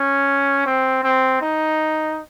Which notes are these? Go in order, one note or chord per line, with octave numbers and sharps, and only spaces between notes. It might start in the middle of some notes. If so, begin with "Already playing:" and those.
Already playing: C#4
C4
C4
D#4